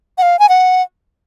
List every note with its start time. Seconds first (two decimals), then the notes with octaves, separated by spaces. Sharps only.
0.18 F#5
0.22 F5
0.39 G#5
0.49 F#5